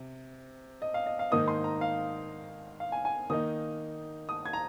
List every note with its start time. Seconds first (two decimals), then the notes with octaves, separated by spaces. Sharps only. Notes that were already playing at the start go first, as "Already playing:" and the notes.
Already playing: C3
0.82 D#5
0.94 F5
1.06 D#5
1.19 F5
1.31 G#2 D#3 A#3 D#4 D#6
1.48 C6
1.64 A#5
1.81 F5
2.80 F5
2.92 G#5
3.05 G#5
3.30 D#3 A#3 D#4 D#6
4.29 D#6
4.46 G#6
4.53 A#5